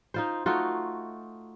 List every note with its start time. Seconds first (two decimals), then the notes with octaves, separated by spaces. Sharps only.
0.14 D#4 F4 C5
0.46 A3 D#4 F4 F#4